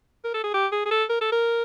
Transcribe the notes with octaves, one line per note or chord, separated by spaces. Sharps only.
A#4
A4
G#4
G4
G#4
G#4
A4
A#4
A4
A#4